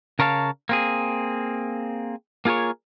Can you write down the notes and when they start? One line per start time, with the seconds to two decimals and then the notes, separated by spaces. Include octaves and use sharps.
0.19 C#3 A#4 C#5 F5 A5
0.69 A#3 C4 G#4
2.45 A#3 F4 G#4 A#4 C#5